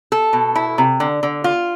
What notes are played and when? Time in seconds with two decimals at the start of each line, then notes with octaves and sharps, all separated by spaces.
0.12 A4
0.33 B2
0.55 E4
0.78 C3
1.00 D3
1.23 D3
1.44 F4